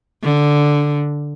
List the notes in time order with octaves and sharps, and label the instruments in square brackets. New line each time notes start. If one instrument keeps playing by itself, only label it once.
[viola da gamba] D3